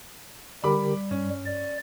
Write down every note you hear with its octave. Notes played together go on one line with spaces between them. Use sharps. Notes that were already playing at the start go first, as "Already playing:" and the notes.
D3 G3 G4 A#4 B5 D6
G2 C#4
D5